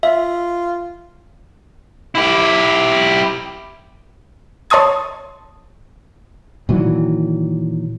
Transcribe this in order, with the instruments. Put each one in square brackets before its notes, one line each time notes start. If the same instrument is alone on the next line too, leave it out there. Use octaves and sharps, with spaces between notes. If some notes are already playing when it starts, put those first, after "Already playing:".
[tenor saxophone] F4 [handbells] E5
[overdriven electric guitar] E4 G4
[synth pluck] C#5 A5 C6 D#6 G#6
[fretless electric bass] A#2 D#3 E3 F#3